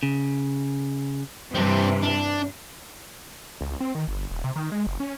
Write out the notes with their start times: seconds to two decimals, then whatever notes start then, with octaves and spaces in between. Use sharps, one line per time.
0.03 C#3
1.55 G2 C3 E3 C4 D4
2.02 D4
3.61 C#2
3.80 C4
3.95 D#3
4.08 G1
4.31 D#1
4.44 C3
4.56 D#3
4.72 G#3
4.87 F#1
5.00 C#4